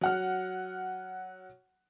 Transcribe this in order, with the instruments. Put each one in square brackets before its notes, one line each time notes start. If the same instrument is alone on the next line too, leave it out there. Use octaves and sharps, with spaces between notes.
[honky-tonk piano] F#3 F#5 F6